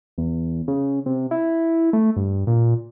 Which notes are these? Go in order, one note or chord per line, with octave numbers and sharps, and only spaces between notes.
E2
C#3
C3
E4
A3
G2
A#2